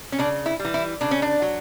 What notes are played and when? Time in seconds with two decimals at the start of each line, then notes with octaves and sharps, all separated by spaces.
0.12 C#4
0.19 C#3 D4
0.46 E4
0.59 G3
0.65 E3
0.74 E4
1.01 C#3 D4
1.11 C#4
1.22 D4
1.42 F#3